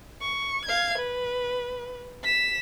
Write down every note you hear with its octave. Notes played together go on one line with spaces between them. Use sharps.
C#6
F5 G#6
B4
B6 E7